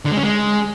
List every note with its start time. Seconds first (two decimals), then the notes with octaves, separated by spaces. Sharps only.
0.06 D3
0.11 G#3
0.17 C#4
0.23 G#3